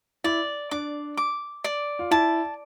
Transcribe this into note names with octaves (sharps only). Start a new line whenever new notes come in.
E4 D5
D4 D6
D6
D5
F4
E4 A5